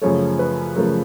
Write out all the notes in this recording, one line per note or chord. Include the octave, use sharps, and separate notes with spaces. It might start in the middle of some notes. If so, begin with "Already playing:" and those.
F#2 C#3 F3 A3 C#5
B4
F#2 C#3 F3 A3 A#4